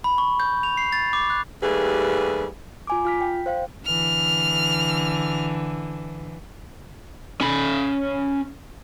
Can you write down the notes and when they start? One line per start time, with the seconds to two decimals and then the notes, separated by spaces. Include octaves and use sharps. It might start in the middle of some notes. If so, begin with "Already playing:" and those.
0.04 B5
0.18 C#6
0.40 G6
0.63 F7
0.77 C7
0.93 A6
1.13 D6
1.30 F#6
1.62 D#2 G3 A3 G#4 B4
2.87 F4 G#5 D6
3.05 F4 F6 B6
3.21 G5
3.46 C5 F5 G5
3.86 D3 E3 F6
7.41 C#4 B5